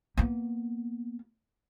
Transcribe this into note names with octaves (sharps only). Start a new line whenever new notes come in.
A#3 B3